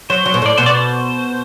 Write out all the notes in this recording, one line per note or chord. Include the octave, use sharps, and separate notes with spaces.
F#3 C5
F#3
B2
A2
D5
B2 C5
D5
C5